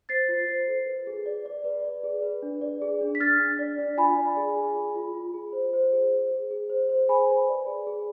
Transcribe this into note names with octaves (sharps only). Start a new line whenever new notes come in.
C5 A6 C7
F4
C5
A4
B4
G#4
D5
D5
B4
D5
G#4
B4
D4
D5
G#4
D4
B6
D4 F6 A6
D4
D5
D4
F4 G#5 B5
D5
G#4
G#4
G#4
F4
F4
G#4
C5
C5
G#4
C5
G#4
G#4
C5
C5
G#4 G#5 B5
B4
D5
G#4
G#4